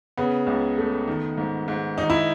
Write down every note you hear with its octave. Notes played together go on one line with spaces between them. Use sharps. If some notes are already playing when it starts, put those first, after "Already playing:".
C#3 B3
C#2
A3
D#3
G#2
G#2
D#3 D#4
E4